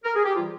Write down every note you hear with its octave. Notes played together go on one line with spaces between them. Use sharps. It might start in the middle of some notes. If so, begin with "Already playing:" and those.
A#4
G#4
G4
C3 E3 G3 F4